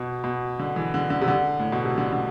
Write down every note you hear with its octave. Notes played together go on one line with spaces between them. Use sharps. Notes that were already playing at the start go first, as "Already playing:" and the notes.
Already playing: B2
B2
D3
E3
D3
D3
C3
D3
A2
B2
C3
D3
D3